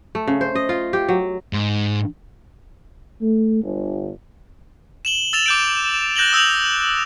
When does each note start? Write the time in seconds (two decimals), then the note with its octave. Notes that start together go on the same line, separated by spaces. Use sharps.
0.15 A3
0.27 C#3
0.41 C5
0.55 D#5
0.69 F4
0.93 G4
1.09 F#3
1.53 G#2
3.21 A3
3.63 G1
5.05 E7 F#7 G7
5.33 E6 A6 E7 F7
5.46 D6 G6 D7
6.16 F#6 G6 A#6 E7 F#7 G7
6.32 D#6 E6 G6 F7